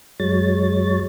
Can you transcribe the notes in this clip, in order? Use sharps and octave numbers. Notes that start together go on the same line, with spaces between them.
F#2 F#3 G#3 C#5 A6